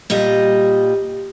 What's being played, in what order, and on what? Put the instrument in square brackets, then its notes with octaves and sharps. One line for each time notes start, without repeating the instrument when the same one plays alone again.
[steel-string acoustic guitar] A#2 G3 G4 D#5